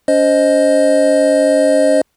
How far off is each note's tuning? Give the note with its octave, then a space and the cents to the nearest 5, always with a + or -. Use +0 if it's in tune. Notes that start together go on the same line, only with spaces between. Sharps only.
C#4 +40 C5 +0 D#5 +0